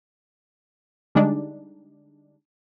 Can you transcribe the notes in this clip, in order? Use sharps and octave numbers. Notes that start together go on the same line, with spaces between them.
D3 G3 G#3 D4 D#4